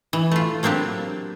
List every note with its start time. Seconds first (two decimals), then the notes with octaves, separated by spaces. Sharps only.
0.13 E3
0.31 A3 F4
0.63 F#3 A#3 C4 D4 G4